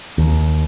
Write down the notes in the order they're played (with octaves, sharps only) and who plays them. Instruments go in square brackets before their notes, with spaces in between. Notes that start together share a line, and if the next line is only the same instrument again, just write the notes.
[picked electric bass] D#2